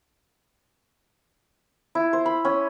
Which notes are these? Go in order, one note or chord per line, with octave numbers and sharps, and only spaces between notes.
E4
C5
B5
C#4